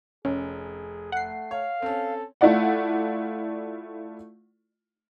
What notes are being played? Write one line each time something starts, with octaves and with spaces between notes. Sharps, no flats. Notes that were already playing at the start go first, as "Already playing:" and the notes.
F1 C#4 G#4
A3 F#5 C7
C#5 F5
C4 C#4 A4
A3 E4 F4 D5 F#5